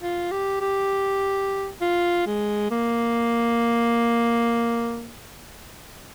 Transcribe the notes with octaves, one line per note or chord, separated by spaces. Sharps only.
F4
G4
G4
F4
G#3
A#3